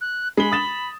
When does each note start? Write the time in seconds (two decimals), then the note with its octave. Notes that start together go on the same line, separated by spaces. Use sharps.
0.01 F#6
0.37 G#3 B5 G7
0.52 D#6 A6 E7